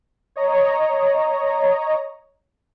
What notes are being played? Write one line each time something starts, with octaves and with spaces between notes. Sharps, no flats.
C#5 D#5 A#5